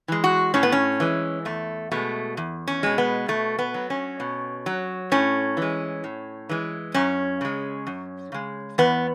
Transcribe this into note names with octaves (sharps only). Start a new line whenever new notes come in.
E3 G#3
F#4
A2 C#4
B3
C#4
E3 G#3
E2 A3
B2 G#3 A3
E2
C#4
B2 G#3
B3
B2 A3
B3
F#3
C#4
B2
F#3
A2 C#4
E3 G#3
A2
E3 G#3
F#2 C#4
C#3 G#3
F#2
C#3 G#3
E2 B3